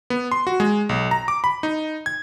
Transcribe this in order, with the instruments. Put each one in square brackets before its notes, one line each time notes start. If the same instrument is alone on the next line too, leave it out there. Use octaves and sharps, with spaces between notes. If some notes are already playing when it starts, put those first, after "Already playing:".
[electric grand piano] B3
C6
F#4
G#3
B1
A#5
D6
B5
D#4
G#6